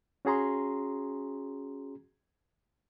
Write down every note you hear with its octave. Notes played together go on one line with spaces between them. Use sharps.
C#4 F#4 G#4 A#5 C6